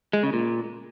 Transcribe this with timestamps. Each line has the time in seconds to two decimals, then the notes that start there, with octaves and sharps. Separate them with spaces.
0.13 G#3
0.23 C#3
0.33 A#2